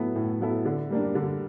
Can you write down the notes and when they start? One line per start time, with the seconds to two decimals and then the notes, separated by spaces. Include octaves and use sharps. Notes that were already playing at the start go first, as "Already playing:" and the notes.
Already playing: A2 F#3 B3 E4 A4
0.15 A2
0.40 F#3 B3 E4 A4
0.65 D3
0.90 G3 A#3 D4
1.15 D3